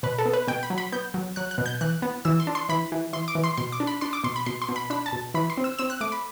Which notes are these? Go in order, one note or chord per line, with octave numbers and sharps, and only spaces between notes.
B2 B4
A4
B3
B4
B2 G5
B5
F#3
B5
B3 G6
F#3
F#3 F#6
F#6
B2
G6
E3 F#6
B3
E3 E6
C6
D4
C6
E3 B5
E3
E3 C6
D6
E3
C6
B2 C6
D6
D4
B5
D4 C6
D6
B2 C6
B5
B2 C6
C6
B2
B5
D4 B5
A5
B2
E3 B5
C6
C4
E6
C4 E6
F#6
A3 D6
B5